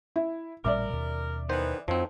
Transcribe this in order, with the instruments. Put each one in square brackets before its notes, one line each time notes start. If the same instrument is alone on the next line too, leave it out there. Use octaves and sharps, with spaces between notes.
[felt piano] E4
[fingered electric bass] A1 A#2 G3 [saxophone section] A#4 [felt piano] D5 E5 D6
[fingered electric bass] D#2 B2
[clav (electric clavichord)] D#3 C5 [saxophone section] E3 B3
[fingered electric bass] F2 [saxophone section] A2 F#3 D#4 [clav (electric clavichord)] F3 C4